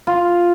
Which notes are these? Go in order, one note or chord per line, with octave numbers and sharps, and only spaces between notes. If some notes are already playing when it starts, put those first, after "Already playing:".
F4